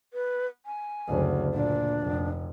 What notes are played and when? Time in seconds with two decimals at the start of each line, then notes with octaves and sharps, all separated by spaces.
0.13 B4
0.66 G#5
1.07 F#1 D2
1.53 A#2 D4
2.01 F1